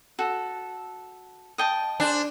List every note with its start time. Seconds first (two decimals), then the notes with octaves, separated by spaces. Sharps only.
0.19 F#4 A4
1.58 D#5 G5 A5
2.00 D4 G#4 C5